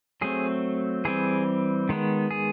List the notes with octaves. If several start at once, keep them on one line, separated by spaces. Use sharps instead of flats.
F#3 A3 C4 G#4
E3 G3 C4 G#4
D#3 G#3 B3
G#4